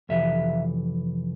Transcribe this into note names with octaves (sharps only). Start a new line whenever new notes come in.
F2 C3 E3 E5